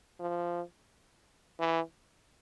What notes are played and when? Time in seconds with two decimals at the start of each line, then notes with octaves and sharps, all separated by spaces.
0.20 F3
1.60 E3